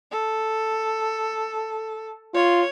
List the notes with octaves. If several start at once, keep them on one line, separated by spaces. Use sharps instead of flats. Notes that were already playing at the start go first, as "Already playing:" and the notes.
A4
F4 C#5